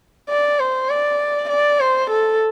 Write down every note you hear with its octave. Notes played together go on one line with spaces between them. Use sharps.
D5
C5
D5
D5
C5
A4